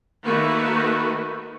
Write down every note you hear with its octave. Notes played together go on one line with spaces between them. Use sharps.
D#3 A3 A#3 F#4 B4